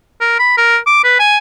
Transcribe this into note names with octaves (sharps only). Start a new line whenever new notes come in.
A#4
B5
A#4
D6
B4
G#5